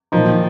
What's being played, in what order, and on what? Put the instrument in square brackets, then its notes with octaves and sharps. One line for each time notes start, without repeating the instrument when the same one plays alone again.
[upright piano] A#2 A#3 D#4 [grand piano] F3
[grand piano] D#3